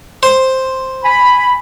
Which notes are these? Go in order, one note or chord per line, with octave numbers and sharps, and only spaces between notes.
C5
G#5 B5